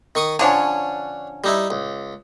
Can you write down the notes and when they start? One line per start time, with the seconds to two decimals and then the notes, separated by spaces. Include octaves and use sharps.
0.15 D#3 C#6 D#6
0.39 D3 F3 C#4 D4 C#5
1.44 G3 D#4 E4
1.70 C#2